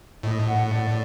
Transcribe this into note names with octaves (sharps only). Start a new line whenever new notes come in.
A2 D#5
F#5
D5